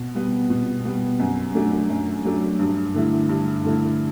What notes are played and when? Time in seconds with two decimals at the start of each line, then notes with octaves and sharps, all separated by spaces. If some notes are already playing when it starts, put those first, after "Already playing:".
Already playing: B2
0.15 G3 B3
0.50 B2
0.85 G3 B3
1.20 F#2
1.55 F#3 A3 D4
1.90 F#2
2.25 F#3 A3 D4
2.59 G2
2.94 D3 A3 E4
3.29 G2
3.64 D3 A3 E4